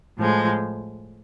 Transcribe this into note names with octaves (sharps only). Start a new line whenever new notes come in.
A2 F3 G#3